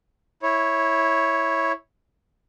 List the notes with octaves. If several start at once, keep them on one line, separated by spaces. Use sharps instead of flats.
E4 C#5